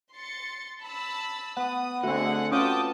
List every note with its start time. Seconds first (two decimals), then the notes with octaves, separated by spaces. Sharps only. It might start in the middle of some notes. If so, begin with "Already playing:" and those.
0.15 C6 A6 C#7
0.82 A5 B5 E6
1.57 B3 F#5 D#6
2.03 D3 A3 C4 F#4 G#4 D#5 F#5
2.52 B3 C#4 F4 F#4 G5 A5 D6 D#6